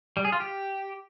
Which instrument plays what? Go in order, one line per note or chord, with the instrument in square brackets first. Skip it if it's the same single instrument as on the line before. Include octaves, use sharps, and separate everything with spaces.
[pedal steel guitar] G3
G#4
F4
G4